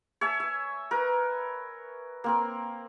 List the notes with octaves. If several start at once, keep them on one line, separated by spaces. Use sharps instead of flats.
C#5 E5 G#5 A5
E5
A#4 B4
A#3 C4 A#4